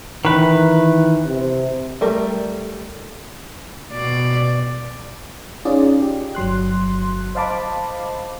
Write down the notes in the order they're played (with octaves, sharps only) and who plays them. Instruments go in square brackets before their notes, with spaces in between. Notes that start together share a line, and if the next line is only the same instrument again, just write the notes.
[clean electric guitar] D#3 B4 [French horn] E3
[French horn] C3
[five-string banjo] G3 A3 A#4
[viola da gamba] B2 D5
[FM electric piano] C#4 D#4 F4 G#4 D5 D#5
G4
G1 F#3 C6 F#6
C5 D#5 F5 A5 B5 D6